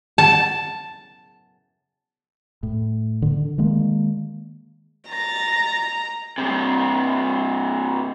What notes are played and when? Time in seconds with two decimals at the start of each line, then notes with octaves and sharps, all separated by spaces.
0.18 A5
2.63 A2
3.22 D3
3.58 D#3 G#3 A#3
5.10 A#5 A6 A#6
6.38 G2 C3